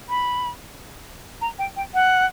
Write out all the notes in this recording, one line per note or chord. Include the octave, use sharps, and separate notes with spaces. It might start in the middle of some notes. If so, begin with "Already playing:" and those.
B5
A#5
G5
G5
F#5